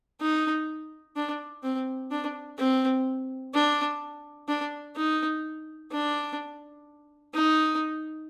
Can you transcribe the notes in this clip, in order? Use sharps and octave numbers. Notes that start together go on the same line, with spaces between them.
D#4
D4
C4
D4
C4
D4
D4
D#4
D4
D#4